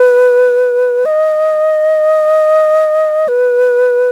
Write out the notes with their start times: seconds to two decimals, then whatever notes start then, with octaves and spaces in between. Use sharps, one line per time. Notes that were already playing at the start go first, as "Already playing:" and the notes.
Already playing: B4
1.06 D#5
3.28 B4